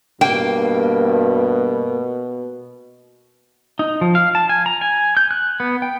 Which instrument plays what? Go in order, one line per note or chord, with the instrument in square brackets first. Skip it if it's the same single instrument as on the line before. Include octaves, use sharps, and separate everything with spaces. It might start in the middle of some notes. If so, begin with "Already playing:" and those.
[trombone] G2 [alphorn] B2 [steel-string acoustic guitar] A#3 [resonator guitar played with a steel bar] G5
[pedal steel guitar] D#4
F3
F5
A5
G#5
A#5
G#5
G6
F#6
B3
G5